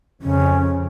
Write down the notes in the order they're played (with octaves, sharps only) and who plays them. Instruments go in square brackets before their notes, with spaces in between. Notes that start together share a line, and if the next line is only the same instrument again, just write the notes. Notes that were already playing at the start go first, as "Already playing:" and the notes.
[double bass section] F2 C#3 [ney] C#4